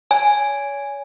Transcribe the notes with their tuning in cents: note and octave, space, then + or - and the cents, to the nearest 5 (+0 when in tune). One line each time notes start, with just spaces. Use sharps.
C#5 +30 G#5 +0